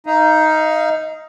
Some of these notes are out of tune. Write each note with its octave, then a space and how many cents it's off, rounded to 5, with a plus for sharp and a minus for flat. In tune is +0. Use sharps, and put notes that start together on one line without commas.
D#4 +10 F5 -30